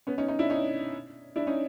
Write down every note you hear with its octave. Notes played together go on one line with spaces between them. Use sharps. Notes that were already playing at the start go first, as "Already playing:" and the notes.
B3 C#4
C#4 D#4
C#4 D#4
D4 E4
C#4 D#4
D4 E4
C#4 D#4